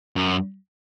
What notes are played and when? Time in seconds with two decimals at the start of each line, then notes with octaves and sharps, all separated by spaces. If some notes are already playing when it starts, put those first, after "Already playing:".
0.16 F#2